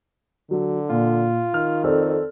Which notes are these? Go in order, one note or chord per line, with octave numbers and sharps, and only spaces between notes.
D3 F#3
A#2 F4
D#3 F6
F2 C4 A4 D5